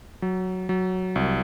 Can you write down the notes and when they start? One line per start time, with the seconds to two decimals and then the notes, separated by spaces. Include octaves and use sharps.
0.22 F#3
0.69 F#3
1.16 C2